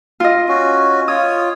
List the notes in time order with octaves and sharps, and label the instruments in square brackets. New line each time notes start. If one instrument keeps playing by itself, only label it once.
[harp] F4 D#5
[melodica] C#4 F#4
[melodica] F4 C#5 [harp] D#6